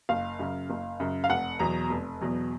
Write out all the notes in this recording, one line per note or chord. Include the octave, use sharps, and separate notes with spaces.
F#1 F5
F#2 C#3
F#1
F#2 C#3
F5
F1 F#5
E2 B2 F#3 A#5
F1
E2 B2 F#3